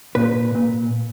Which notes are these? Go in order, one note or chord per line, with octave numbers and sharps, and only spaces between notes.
A#2 B4
A#2